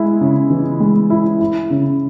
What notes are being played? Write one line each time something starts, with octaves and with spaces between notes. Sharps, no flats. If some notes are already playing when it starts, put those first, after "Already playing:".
Already playing: G#3 E4
C#3
E3
G#3
E4
E4
C#3